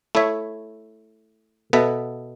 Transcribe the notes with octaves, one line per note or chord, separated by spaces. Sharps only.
A3 E4 C#5 E5
B2 B3 A4 E5